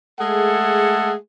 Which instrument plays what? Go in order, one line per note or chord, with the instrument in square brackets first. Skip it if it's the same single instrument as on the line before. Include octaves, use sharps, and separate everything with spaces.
[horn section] G#3 A3 G#4 A4 F#5